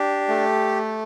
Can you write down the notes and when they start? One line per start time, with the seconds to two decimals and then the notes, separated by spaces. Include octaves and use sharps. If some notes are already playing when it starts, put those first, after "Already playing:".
Already playing: D4 G4
0.28 A3